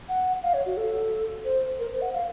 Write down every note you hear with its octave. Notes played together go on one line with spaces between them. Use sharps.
F#5
F5
C#5
F#4
A4
C5
A#4
C5
F#5
F5